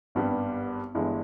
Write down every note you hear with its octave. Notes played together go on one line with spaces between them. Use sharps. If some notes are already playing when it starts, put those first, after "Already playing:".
G#1 G2 G3 B3 G4
G1 G2 E3 G#3